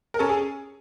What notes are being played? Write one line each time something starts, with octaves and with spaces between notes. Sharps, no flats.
A#4
C#4 A4
G#4